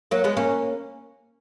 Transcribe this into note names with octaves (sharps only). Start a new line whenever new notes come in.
F#3 A#3
G#3 B3
A#3 C#4